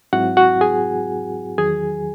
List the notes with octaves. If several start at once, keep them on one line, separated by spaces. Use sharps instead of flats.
G#2 F#3 C4 E4 F#4 F#5
F#4 F#5
G#4 G#5
E2 D#3 F#3 G#4 G#5